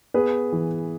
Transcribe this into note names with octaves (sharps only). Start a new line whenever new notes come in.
B3 G#4 B4
E3